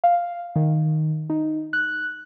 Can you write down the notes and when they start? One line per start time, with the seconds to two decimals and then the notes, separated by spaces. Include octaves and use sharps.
0.04 F5
0.56 D#3
1.30 D#4
1.73 F#6